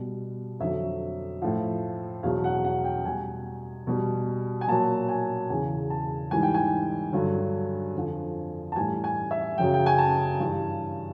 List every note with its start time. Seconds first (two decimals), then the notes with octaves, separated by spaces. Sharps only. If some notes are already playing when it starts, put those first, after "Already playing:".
Already playing: B2 G3
0.60 F2 D3 F#3 E5
1.42 A2 F3
2.23 E2 B2 F#3 F5
2.44 F#5
2.64 F#5
2.84 G5
3.05 B2 G3 G#5
3.87 B2 G3
4.61 G#5
4.68 A#2 F#3 A5
5.09 G#5
5.50 E2 C#3 E3 G#5
5.90 A5
6.31 G#2 E3 G3 G#5
6.43 G5
6.54 G#5
7.12 G2 D3 F#3
7.95 F2 D3 F3
8.72 A5
8.76 A2 E3 G3 G#5
9.04 G#5
9.31 E5
9.58 F#2 C#3 F#3 G5
9.74 G5
9.86 G#5
9.98 A5
10.40 G2 E3 G3